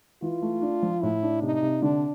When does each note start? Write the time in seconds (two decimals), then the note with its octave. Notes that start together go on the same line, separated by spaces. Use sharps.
0.22 E3 F4
0.42 A3
0.62 D4
0.83 F3
1.02 A2 E4
1.23 D4
1.42 C3 D#4
1.63 C3
1.82 D3 D4